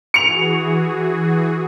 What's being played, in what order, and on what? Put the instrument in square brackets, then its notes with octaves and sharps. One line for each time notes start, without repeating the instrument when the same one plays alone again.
[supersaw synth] E3 F#4 G#4 [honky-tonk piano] C#7 F7